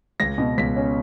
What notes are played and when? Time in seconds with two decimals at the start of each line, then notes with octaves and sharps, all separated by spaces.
0.20 C#2 A#6
0.38 B2
0.57 C#2 B6
0.76 C#4